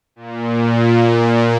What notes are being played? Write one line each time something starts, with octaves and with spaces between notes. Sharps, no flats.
A#2